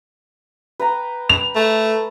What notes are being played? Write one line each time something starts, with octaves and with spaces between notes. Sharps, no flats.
B4 G5 A#5
F7
A3